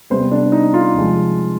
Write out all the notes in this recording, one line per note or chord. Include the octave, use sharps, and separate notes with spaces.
C3 G3 B3 C5
D4
D#4
F4
C3 F3 G#3